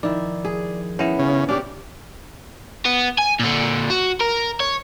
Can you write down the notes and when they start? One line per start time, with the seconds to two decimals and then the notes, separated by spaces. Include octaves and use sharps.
0.03 D#3 F3 E4 D5
0.45 G#4
0.99 B3 C#4 E4
1.19 C#3
1.49 C#4 D4 G4
2.85 B3
3.19 G#5
3.39 A#2 D3
3.90 F#4
4.20 A#4
4.60 C#5